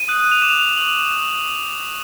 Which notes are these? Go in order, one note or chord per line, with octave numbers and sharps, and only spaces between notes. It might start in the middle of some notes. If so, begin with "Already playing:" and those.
Already playing: D#7
D#6 F#6
F7
D6 F#6 E7
F7
C#6 E6 G6 F#7
C#6 F#6